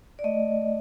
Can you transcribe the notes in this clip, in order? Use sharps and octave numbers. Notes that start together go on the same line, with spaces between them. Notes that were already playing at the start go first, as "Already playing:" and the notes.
D5
A3 D#5